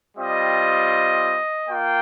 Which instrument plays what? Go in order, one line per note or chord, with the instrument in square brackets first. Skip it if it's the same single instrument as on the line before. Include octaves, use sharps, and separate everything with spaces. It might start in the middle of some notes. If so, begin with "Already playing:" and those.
[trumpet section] G3 C4 F4 D#5
A#3 F4 G5